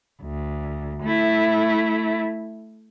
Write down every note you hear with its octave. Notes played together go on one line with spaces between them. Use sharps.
D2
A3 E4